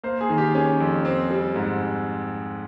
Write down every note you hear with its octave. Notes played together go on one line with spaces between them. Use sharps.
A#3 C5
G#4
D#3
G4
C#4 G#4
F2
C4
G3
G#2